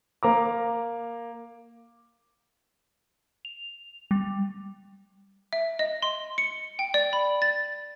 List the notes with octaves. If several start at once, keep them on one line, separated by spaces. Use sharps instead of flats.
A#3 A#5 D6
F7
G3
E5
D#5
C6
C#7
G5
D5
B5
A6